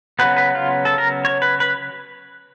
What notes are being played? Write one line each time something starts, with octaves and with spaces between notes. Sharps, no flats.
C#3 F#3 B3 B4
B4
F4
A4
A#4
C#5
B4
B4